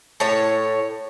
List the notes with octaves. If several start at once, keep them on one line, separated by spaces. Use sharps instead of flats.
A2 C#5